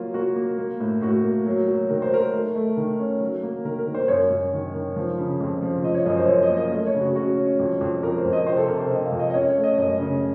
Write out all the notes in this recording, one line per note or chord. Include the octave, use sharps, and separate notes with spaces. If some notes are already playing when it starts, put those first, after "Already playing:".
Already playing: F#3 A#3 F4
A#3 F#4
A#3
A#3
A2
A2 F#4
A#3
F#3
F#3
D#3 A#4
C5
F#3 A#4
A3
A3
D#3
C#4
F#3
A#3
D#3 A#4
A#4
D#3
C5
F#2 C#5
F#2
D#3
D#3
F3
C#3
F2
F3
F3 D#5
C#5
F#2 D#5
C5
F#2 C#5
D#5
A#3
D#5
A3 D#5
C#5
C#3
F#4
C#4 F#4
C#4
F2
F2
F2 A#4
C5
F2
D#5
C3 C5
A4
C3 A#4
C5
C3 D#5
F5
F2
D#5
D#5
C#4 C#5
C#5
A3
D#5
F#2 D#5
C#3